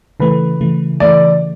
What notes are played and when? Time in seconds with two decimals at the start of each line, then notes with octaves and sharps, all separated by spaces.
0.20 C#3 E3 A3 B4
0.61 C#3 E3 A3
1.00 C#3 E3 A3 D5